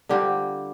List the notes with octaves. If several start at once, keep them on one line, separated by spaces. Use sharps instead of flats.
D3 G3 C4 F4 G4